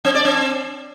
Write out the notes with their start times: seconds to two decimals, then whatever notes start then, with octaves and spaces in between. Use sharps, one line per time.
0.05 C4
0.15 D5
0.25 C4